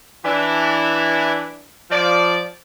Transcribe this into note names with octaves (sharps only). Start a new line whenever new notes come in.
E3 D4 E4
F3 D5